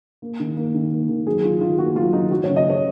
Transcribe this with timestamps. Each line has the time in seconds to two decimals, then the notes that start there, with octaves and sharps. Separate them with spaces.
0.22 A#3
0.40 D#3
0.57 A#3
0.74 D#3
0.91 A#3
1.09 D#3
1.27 F#3 G#4
1.43 D#3 F4
1.61 D#3 F4
1.78 A#3 F#4
1.95 F#3 F4
2.13 D#3 D#4
2.31 F#3 F#4
2.44 C#5
2.48 C#3
2.56 D#5
2.66 C#3 C#5